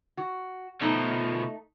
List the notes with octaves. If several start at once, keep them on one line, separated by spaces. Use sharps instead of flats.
F#4
B2 F3 A3 D#4